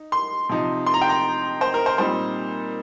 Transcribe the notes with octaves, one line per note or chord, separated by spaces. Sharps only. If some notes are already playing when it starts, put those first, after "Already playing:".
Already playing: D#4
C6
C3 F3 D#4
C6
A#5
G5
A#5
C5
A#4
C5
A#2 G3 C4 D#4 C5